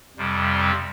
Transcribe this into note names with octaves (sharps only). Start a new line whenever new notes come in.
F2 C3 G3
C4